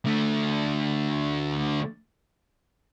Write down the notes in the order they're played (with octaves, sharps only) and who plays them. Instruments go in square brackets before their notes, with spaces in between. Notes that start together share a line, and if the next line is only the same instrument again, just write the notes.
[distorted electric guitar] D3 A3